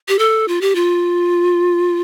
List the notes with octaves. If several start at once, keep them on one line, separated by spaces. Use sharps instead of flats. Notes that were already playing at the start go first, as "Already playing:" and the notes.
G4
A4
F4
G4
F4